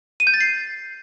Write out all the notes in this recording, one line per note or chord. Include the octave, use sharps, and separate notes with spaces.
D#7
G6
A6
C7